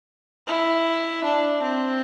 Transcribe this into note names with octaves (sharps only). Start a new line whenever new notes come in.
E4
D4
C4